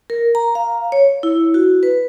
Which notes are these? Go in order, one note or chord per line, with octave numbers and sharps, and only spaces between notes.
A#4
A#5
F5
C#5
E4
F#4
B4